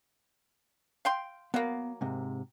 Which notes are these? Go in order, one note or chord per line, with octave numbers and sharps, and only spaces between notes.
F5 G5 C6
F#3 A#3 B3 F5 F#5
G#2 C3